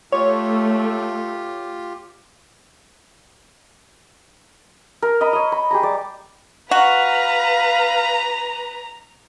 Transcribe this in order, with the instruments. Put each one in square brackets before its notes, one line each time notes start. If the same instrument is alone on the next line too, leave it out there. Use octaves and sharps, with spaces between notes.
[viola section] A3 [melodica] F4 G4 [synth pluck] C#5
[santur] A#4
D#5 A#5 B5
C#5 D#5
B5
G4 G#4 A#5
G3 D5
[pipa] F#4 [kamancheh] B4 [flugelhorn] F5 [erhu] A#5